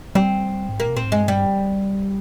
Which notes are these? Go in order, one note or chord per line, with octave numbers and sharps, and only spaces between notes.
G3 C4
G#2
A#2 A#3
C3
A#2 C4
G#2
G2 G#3
G3